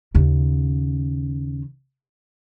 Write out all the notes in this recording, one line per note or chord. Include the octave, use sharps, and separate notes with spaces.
D#2 C#3